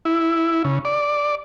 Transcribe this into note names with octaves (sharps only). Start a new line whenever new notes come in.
E4
C#3
D5